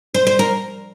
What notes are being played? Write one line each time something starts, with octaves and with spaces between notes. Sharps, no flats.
C5
C5
A#4